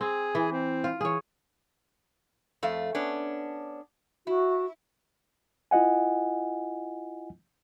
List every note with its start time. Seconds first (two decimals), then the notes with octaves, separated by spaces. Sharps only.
0.01 C4 G#4
0.35 E3
0.52 C4
0.84 F4
1.01 E3 G#4 C#5
2.63 F2 A3 F5
2.95 B3 C#4 D4
4.27 E4 F#4
5.71 E4 F4 D#5 F#5 G#5